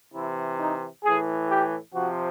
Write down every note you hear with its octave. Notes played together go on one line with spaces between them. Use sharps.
C3 E3 E4
D#4
A2 E3 G#4
G4
C3 F3 F#4